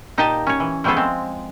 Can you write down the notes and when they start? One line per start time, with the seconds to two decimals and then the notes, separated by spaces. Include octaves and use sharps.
0.18 A#2 D#4 G4 D#5 G5 A5
0.47 C#4 C#5
0.60 E3
0.84 F3 G3 A3 B3 G#4 A4
0.97 G#3 C4